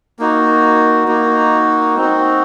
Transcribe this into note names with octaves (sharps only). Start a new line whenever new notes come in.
A#3 D#4 F#4
A#3 D#4 F#4
C4 D#4 F#4